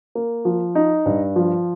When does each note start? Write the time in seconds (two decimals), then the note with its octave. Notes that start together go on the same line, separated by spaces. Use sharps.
0.15 A#3
0.45 F3
0.75 D#4
1.06 G2
1.36 F3